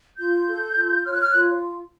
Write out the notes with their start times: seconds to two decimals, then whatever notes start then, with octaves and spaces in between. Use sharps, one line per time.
0.18 F4 G6
0.47 A4
0.76 F4
1.05 C#5 F6
1.13 F#6
1.21 F6
1.31 F4 F#6